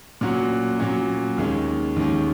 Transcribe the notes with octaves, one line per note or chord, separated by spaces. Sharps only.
A#2 F#3 C#4 F#4
A#2 F#3 C#4 F#4
D#2 D#3 G#3 C#4
D#2 D#3 G#3 C#4